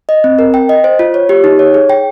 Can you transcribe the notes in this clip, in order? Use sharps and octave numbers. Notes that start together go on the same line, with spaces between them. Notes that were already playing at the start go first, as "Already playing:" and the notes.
D#5
C4
A#4
G5
D#5
C5
F4
C#5
G4
D#4
C#5
G#4
G5